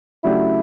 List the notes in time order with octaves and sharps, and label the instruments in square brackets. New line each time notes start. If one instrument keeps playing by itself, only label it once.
[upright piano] C#3 F#3 A3 D4 G4 [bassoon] E4